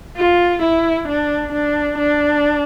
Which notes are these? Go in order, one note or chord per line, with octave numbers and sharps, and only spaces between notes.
F4
E4
D4
D4
D4